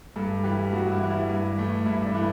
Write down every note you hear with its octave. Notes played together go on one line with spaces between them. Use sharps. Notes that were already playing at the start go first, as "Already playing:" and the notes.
G2 A4
E3 G3 G4
G2 F#4
E4
E3 G3
E4
G2
E3 A3
G2 E4
D4
E3 A3 E4